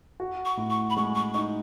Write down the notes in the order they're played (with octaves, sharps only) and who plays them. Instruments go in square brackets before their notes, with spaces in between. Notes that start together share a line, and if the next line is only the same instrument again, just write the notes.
[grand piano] F#4
[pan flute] C#6
[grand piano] A2
[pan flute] C#6
B5
[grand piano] G#3 [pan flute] C#6
[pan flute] C#6
[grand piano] D#4 [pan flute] C#6